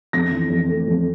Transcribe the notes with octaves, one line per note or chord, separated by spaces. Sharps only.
F2 A#6
E3
F2
A3
F2